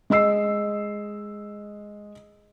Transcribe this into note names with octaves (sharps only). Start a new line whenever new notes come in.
G#3 D#5 E6 C7